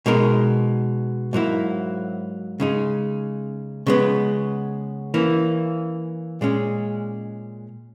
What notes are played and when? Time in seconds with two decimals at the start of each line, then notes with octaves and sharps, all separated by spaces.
0.06 B2 G#3 D#4 A#4
1.33 G#2 F#3 A#3 E4
2.60 C#3 G#3 D#4
3.86 C#3 G#3 B3
5.14 E3 A#3 C#4
6.41 A#2 G#3 C#4